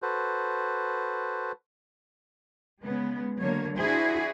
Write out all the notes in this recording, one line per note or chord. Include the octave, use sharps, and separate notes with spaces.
F#4 A4 B4 C5
C#3 G#3 B3
D3 F#3 A#3 C#5
D4 E4 F#4 G#4 C5